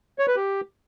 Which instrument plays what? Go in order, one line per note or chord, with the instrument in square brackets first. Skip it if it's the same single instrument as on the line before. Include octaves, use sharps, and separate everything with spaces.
[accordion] C#5
B4
G4